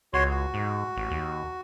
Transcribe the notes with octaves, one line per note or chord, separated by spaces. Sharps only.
C#2 F#4 C#5 C6
F#4
G#2
A1
D#2